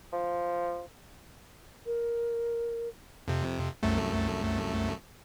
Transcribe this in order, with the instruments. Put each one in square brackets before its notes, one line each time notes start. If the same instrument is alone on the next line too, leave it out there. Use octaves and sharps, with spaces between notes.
[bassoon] F3
[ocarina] A#4
[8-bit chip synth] F2 C3
C2 F#2 A3